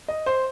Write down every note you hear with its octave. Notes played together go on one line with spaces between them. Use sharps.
D#5
C5